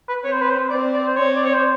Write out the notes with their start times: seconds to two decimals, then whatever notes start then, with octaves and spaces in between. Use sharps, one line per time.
0.09 B4
0.24 C4 C#5
0.32 C5
0.41 B4
0.50 C5
0.70 C4 D5
0.93 D5
1.05 C5
1.17 C4 C#5
1.36 D5
1.45 C#5
1.54 C5